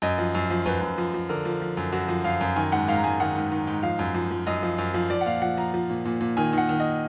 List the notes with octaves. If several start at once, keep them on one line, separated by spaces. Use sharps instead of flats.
F#2 D#5
F3
F#2
F3
F#2 B4
F#2
F3
F3
D3 A#4
F3
F3
F#2
F#2 F#4
F3
F#2 F5
F#2
D#3 G#5
G#2 F#5
G#2 F5
A#5
G#2 G#5
D#3 F#5
G#2
D#3
G#2
F3 F5
F#2
F3
F3
F#2 D#5
F3
F#2
F3
F3 D5
F#5
A#2 F5
F3 F#5
F3 A#5
F3
A#2
A#2
A#2
D#3 G#5
D#3 F#5
D#3
D#5